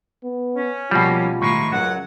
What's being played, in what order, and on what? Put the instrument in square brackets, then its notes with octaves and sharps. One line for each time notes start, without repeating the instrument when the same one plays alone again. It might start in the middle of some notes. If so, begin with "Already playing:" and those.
[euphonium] B3
[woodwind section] C#4
[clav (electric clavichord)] B2 G3 [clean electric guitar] F3 A#3 [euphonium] F4
[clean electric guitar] A2 D#3 G#3 [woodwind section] A#5 B5 C#6
[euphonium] C#2 [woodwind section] F#2 F#5 [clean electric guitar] F#3